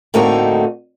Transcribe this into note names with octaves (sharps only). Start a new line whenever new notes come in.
A2 D3 A#3 C4 D#4 F#4